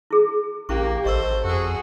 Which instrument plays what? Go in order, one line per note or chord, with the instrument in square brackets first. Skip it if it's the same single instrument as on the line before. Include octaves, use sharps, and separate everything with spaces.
[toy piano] E4 G#4
[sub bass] A#1 [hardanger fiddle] A#3 [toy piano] C#4 E4 C#6 [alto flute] G4
[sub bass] G#1 [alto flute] A4 [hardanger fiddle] C5 [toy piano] D#5 C#6 E6
[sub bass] F2 [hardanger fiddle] F#4 G#4